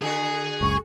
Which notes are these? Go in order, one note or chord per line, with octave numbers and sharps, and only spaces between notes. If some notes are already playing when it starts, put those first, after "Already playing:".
D3 F#4 G#4 G#5
F#1 C#2 C#6